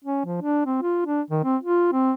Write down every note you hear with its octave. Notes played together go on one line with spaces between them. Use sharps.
C#4
F3
D4
C4
F4
D4
D#3
C4
F4
C4